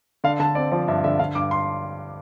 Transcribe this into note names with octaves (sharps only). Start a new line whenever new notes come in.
D3 F5
D3 A5
C4 D5
F3 D5
G2 E5
D3 E5
D3 F5
G2 D6
C6